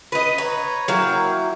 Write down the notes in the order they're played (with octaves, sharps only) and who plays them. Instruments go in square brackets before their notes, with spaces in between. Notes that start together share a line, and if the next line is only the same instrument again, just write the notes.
[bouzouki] B4 D#5
[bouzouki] B4 [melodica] C#5 A#5
[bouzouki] F#3 E4 [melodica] A#3 A#4 G5